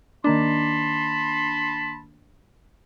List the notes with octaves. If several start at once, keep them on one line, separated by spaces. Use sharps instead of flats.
D#3 A#3 D4 A5 B5 C6